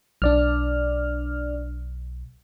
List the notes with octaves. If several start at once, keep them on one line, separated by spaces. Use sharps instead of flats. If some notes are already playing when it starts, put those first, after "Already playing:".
B1 D4 D5 F6